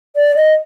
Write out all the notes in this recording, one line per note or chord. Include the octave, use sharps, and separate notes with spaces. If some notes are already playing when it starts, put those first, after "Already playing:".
D5
D#5